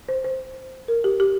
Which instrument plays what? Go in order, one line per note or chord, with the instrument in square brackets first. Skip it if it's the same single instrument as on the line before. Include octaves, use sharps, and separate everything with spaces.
[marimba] C5
C5
A#4
G4
G4